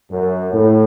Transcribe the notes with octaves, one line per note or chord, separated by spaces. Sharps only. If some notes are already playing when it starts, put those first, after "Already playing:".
F#2
A2